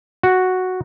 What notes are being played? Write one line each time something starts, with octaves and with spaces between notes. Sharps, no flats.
F#4